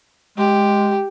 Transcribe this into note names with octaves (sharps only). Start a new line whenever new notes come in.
G#3 G4